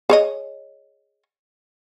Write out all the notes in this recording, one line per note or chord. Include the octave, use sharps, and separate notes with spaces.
G#4 C#5 D#5